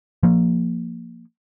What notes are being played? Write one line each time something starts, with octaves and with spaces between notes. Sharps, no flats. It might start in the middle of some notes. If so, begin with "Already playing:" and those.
F3 A#3